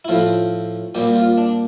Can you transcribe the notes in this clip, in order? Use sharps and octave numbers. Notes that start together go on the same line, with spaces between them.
E4
A2 F3 C4 F4
A#2 G3 C4 G4
F4
D4